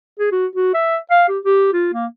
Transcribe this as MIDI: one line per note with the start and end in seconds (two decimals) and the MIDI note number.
0.20 0.31 68
0.32 0.46 66
0.56 0.73 66
0.74 0.97 76
1.11 1.24 77
1.29 1.39 67
1.45 1.69 67
1.73 1.89 65
1.94 2.06 58